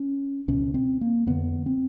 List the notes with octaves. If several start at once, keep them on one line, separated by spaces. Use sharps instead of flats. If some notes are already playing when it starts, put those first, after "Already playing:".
Already playing: C#4
C#2 B2 C#4
C4
A#3
F2 D3 B3
C4